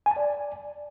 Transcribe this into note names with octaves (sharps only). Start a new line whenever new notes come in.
G#5
A5
D5